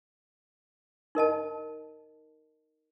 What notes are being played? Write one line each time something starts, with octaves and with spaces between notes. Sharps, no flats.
D#4 A#4 D#5 A5